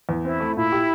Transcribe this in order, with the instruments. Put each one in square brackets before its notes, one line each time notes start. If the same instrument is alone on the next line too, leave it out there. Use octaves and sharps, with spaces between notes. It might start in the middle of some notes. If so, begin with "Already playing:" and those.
[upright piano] E2
[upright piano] C4 [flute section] E4
[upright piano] A3
[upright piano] A#2 [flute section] E4
[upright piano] G4